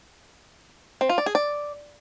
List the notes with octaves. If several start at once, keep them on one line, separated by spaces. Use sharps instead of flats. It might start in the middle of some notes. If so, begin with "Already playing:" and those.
C4
F4
D5
G#4
D5